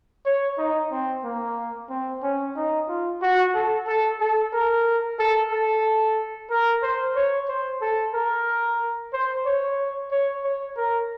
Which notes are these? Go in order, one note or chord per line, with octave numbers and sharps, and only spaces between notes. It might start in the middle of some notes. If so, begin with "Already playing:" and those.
C#5
D#4
C4
A#3
C4
C#4
D#4
F4
F#4
A4
A4
A4
A#4
A4
A4
A#4
C5
C#5
C5
A4
A#4
C5
C#5
C#5
C#5
A#4